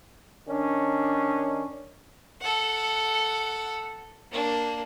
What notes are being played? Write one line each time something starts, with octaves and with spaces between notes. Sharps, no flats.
D#3 C#4 D4
A4 F#5
A#3 D4